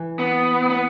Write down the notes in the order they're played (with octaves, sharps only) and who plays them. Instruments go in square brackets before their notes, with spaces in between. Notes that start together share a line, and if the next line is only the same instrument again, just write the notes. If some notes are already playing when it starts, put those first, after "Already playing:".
Already playing: [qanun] E3
[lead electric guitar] B3
B3